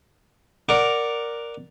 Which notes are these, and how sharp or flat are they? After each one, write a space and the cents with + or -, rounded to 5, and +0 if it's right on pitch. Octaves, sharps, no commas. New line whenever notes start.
A#4 +0 D5 +0 F#5 +0